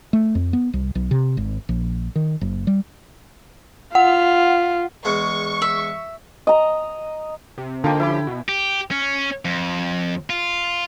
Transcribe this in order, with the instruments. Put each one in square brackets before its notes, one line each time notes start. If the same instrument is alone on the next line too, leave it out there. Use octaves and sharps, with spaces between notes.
[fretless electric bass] A3
F2
B3
C2
B1
C3
G#1
A#1
D#3
F#1
G3
[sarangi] F4 [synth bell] F#5
[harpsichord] E2 G#3 [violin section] C#6
[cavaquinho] E5
[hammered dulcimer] D#5 A#5
[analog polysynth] C3
[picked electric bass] D3 [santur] F3 G5 [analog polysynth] A#3 D#4
[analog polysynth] F3 C#4 G4 [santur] E4 B5
[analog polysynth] B2
[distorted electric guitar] G4
C#4
F2
F4